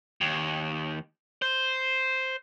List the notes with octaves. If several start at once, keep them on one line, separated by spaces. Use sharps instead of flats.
D#2
C5